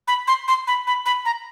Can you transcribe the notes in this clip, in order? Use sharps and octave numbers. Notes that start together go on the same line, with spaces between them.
B5
C6
C6
B5
B5
B5
A#5